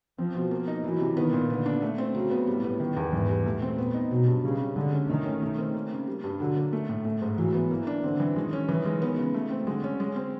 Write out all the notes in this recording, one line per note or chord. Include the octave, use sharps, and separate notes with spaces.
F3 C4
B2
A#3
D#4
E3 F#3
C3
D#3 B3
A#2
D3 B3
D4
A3
C4
C#3 F#3
B3
A2 G3
B3
D#3
E2
G#2 E3
G3
A#2 A3
C4
B3
D#4
B2 F#3
G2
C#3 G3
C3
D3 G#3
C#4
D#3 A3
C#4
A3
C4
A#3
C#3
G3
G2
D3 F#3
A#3
A3
A2
A3
G#2
E3 F#3
B3
E3 A#3
D4
D3 C4
E3
D#3 G#3
C#4
D#3 E3
G#3
B3
C#3
A3
C4
D3 G#3
C#4
G#3
C4